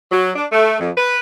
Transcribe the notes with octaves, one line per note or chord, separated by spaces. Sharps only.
F#3
D4
A3
F2
B4